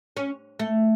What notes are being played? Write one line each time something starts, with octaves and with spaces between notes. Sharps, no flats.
C#4
A3